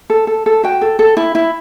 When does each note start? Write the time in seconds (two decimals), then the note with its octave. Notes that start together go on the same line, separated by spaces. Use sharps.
0.10 A4
0.27 A4
0.46 A4
0.64 F#4 G5
0.81 A4
0.99 A4
1.17 E4
1.35 E4